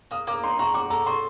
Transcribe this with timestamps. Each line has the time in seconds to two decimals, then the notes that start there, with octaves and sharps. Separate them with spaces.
0.11 A#3 D#6
0.27 A#3 D6
0.43 D#4 C6
0.59 F#4 A#5
0.74 F#4 D6
0.90 A4 A#5
1.06 F#4 C6